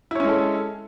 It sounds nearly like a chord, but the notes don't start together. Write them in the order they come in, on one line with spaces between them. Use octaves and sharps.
E4 C#5 C#4 G#3 A4